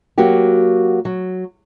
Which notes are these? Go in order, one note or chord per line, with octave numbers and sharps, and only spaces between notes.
F#3 A#3 F#4 G4
F#3